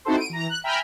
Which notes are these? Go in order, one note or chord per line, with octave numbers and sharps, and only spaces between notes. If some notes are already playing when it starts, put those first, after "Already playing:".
C4 D#4 E4 F#4 A4 C5
D7 D#7
E3 A#5
F#6
E5 G5 G#5 A#5 B5 F6